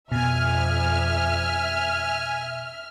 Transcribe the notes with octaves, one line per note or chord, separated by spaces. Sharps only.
F2 B2 E5 G#5 F6